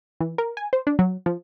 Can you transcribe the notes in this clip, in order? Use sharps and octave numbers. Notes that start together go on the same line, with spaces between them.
E3
A#4
G#5
C5
D4
F#3
F3